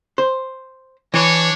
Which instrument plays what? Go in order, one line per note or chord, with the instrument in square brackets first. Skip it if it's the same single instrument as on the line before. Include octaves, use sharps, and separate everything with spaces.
[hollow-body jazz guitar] C5
[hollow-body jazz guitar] E3 [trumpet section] D4 C#5